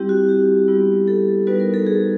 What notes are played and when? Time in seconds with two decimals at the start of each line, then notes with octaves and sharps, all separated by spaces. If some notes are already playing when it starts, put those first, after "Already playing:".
Already playing: G3 C4 E4 G4
0.09 F#4
0.29 G4
0.68 G3 B3 E4
1.08 A4
1.47 G3 B3 D#4 F#4 B4
1.60 A#4
1.74 A4
1.87 G#4